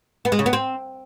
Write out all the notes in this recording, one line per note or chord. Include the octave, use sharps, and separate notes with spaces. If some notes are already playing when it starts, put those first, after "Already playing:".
B3
G#3
C#3
B3
C4